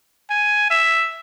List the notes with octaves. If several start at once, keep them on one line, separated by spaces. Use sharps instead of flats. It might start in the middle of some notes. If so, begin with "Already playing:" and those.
G#5
E5